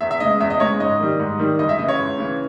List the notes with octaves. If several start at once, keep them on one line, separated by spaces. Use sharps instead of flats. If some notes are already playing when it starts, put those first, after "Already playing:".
E2 E5
E5
C#3 G#3 D#5
E2 E5
D#5
C#3 G#3 C#5
G#2 D#5
D#3 G3
G#2
D#3 G3
C#2 D#5
E5
C#3 E3 D#5
C#5
C#2
C#3 E3